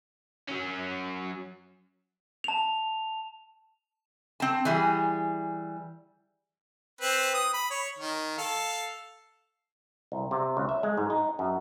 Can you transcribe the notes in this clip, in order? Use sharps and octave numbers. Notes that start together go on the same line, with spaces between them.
F#3 C#4
A5 F7
C4 A5
E3 G3 G#4
C4 B4
D#6
B5
C#5
D#3
A4 F5
C2
C3
C#2
E5
G#3
G#2
D#4
F#2